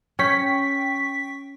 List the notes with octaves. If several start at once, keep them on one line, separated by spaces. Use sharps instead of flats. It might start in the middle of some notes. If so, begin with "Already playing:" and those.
C#4 G5 C#6 B6